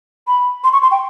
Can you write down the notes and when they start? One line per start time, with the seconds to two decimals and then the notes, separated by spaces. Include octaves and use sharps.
0.27 B5
0.64 C6
0.73 C#6
0.83 C6
0.91 G5